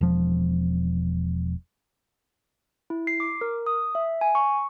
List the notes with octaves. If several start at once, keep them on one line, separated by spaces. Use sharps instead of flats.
E1 F3
E4
C7
D6
A#4
D#6
E5
G#5
C#6